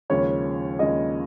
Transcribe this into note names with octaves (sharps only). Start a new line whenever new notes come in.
D#2 C#3 F3 G#3 C#5
D#2 C#3 F3 G#3 D#5